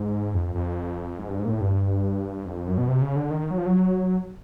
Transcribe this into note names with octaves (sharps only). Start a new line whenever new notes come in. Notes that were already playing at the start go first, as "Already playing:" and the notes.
Already playing: G#2
F2
F2
G#2
G2
G#2
A#2
A2
G2
F2
F#2
B2
C3
C#3
D3
D#3
F#3
F3
F#3